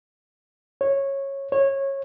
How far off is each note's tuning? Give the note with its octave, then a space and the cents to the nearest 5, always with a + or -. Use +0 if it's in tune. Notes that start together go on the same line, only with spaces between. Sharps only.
C#5 -15
C#5 -20